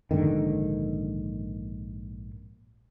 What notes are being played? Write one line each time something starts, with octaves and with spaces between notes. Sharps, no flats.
A#1 G#2 D3 D#3